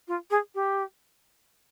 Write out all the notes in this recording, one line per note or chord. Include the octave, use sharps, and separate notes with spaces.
F4
G#4
G4